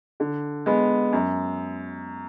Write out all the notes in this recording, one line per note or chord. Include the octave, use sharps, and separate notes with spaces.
D3
G#3 B3
F#2